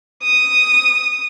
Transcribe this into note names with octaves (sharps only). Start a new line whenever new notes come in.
D#6